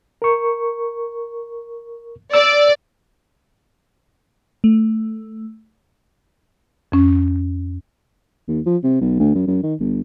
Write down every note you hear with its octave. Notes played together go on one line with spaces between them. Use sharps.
A#4 C#6
D5 E6
A3
F2 C#4
D#2
F3
C3
B1
D2
F#2
F#2
D#3
G1